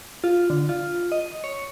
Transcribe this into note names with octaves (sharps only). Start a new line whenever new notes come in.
F4
D3
F4
D#5
C#5